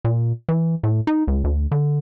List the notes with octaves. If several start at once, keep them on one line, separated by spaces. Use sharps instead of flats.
A#2
E3
A2
D#4
C#2
D2
D3